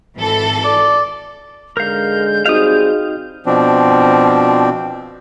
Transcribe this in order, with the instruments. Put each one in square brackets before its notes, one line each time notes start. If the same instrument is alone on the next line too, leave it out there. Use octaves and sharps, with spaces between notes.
[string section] G#1 E3 A4
[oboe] D5
[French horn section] G#2 D3 G#3 [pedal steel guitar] A#4 F5 [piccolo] G6
[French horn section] G3 C4 G#4 [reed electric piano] D#4 F#4 D#5 [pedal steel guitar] F5 D#6
[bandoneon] B2 F3 C4 D4